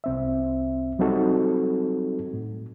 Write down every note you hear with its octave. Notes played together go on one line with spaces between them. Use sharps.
C2 C4 E5
F#3 G3 C4 D#4 F#4 A4
A2